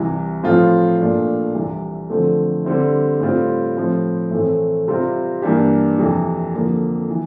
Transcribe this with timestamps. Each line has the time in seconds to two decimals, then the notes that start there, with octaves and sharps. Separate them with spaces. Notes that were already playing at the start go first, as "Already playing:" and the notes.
Already playing: C2 C3 E3
0.43 A2 F3 C4 F4
0.99 A#2 A3 D4 F4
1.54 C2 C3 E3
2.10 D3 F3 A3 C4
2.65 D3 G3 C4 E4
3.20 A2 G3 C4 F4
3.77 A2 F3 C4
4.31 A2 E3 A3 C4
4.88 C3 G3 C4 F4
5.42 G2 E3 A#3 D4 G4
5.97 F2 C3 E3
6.53 F2 D3 F3 A#3
7.10 E3